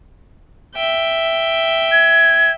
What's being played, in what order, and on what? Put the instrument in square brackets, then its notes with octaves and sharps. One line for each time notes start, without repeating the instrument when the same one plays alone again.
[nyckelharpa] E5 G5
[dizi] G#6